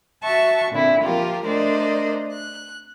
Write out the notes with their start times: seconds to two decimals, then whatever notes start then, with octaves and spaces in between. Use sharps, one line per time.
0.23 F#4 E5 A5 C#6
0.70 A#2 D3 C4 E4
1.03 F3 A#3 F4 G4 A#4
1.45 A3 D4 A#4 C5 D5 D#5
2.33 F#6